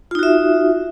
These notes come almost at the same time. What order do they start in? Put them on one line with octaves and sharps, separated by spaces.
F4 D#4 F#4 E5